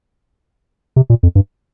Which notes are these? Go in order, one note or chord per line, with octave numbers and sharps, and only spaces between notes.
C3
A#2
F2
G2